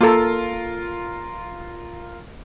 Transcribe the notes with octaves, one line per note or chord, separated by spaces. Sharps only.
A#3 F4 A4 A#4